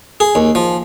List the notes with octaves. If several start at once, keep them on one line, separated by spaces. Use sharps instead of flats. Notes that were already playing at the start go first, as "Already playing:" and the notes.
G#4
D#2
F3